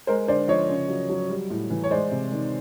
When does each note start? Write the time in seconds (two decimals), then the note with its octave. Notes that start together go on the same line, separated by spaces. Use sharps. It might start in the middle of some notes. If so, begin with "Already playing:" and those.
0.07 G#3 A#4 C5
0.28 D3 C5 D5
0.48 F3 C#5 D#5
0.69 C#3
0.88 F#3
1.10 F#3
1.30 G3
1.50 A2
1.70 E3
1.84 C#5
1.91 G#3 C5 D5
2.11 C3
2.32 D#3